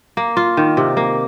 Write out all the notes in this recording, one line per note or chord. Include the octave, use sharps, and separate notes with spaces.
A#3
F4
D#3
C3
A#3